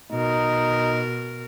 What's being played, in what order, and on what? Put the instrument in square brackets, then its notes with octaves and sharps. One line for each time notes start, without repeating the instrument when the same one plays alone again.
[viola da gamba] B2 A#4 [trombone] D#4